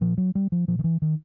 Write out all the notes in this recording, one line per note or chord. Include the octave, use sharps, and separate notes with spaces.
A#2 F3
F#3
G3
F3
A#2 F3
D#3
E3
D#3